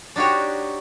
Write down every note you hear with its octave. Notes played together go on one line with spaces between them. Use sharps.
D4 D#4 F#4 G4 C#5